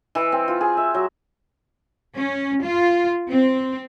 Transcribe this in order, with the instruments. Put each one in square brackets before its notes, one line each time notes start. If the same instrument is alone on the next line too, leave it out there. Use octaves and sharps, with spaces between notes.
[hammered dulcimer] E3
C4
F4
G#4
E5
F#3
[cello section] C#4
F4
C4